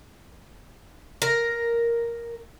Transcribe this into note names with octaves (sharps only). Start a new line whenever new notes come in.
A#4